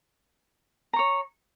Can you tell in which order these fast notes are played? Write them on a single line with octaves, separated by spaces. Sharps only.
A#5 C#6 C#5